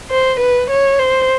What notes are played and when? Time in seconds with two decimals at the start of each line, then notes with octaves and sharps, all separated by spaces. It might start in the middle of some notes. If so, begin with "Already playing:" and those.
0.10 C5
0.40 B4
0.70 C#5
0.99 C5